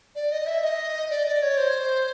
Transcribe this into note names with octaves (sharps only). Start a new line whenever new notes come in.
D5
D#5
E5
D#5
D5
D5
C#5
C5